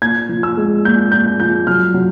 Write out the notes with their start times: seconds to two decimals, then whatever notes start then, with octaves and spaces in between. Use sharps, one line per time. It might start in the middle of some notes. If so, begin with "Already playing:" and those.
0.02 A#2 G#6
0.29 F3
0.43 E6
0.57 G#3
0.85 A#2 G6
1.12 A#2 G6
1.40 F3 G6
1.67 F#3 F6
1.94 F#3